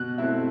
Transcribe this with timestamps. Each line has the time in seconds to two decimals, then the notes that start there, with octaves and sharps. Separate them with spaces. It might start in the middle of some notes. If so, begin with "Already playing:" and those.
Already playing: B2 F#6
0.18 A3 C4 E4